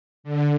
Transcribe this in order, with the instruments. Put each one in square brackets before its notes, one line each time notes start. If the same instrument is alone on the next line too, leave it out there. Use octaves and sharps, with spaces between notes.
[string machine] D3